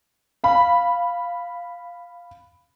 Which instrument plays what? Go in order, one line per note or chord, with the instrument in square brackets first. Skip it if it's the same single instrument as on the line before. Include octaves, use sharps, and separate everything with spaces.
[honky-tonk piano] F5 B5